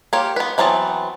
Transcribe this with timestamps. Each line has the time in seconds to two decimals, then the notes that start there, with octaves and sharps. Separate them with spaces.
0.13 A#3 F4 G4 C#5
0.36 B3 B4
0.58 E3 F#3 B3 C4 A5